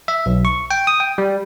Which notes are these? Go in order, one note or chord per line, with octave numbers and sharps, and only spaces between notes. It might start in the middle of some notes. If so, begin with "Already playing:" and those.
E5
B1
C#6
G5
D#6
G5
G3